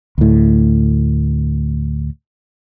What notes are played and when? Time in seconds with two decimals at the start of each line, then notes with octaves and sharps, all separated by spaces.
0.18 D2 A2